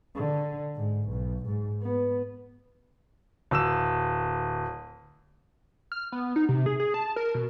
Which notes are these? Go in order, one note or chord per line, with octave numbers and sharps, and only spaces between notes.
D3
G#2
B1
G#2
B3
D1 E6 E7
F6
B3
D#4
C3
G#4
G#4
A5
A#4
B2